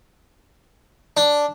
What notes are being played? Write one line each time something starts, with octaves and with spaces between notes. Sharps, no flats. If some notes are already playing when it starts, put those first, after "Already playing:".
D4